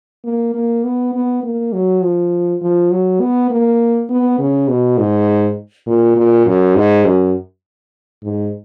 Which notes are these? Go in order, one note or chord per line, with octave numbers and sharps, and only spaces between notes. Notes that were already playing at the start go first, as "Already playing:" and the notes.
A#3
A#3
B3
B3
A#3
F#3
F3
F3
F#3
B3
A#3
B3
C#3
B2
G#2
A#2
A#2
F#2
G#2
F#2
G#2